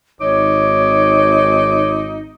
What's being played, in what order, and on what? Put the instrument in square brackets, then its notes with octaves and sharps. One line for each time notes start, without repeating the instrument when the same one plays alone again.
[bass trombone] G#1 [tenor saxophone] D#4 [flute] C#5 [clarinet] D6